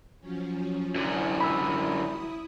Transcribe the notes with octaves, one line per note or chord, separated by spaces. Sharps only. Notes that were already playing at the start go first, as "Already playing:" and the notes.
F3 F#3 C#4
F#2 D3 E4 D#6
B5 E6